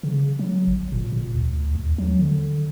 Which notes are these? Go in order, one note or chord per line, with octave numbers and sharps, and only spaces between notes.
C#3
F#3
G1
A#2
A#2
D2
D#2
F#3
D3